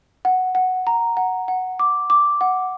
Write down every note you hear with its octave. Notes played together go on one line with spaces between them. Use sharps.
F#5
F#5
A#5
F#5
F#5
D6
D6
F#5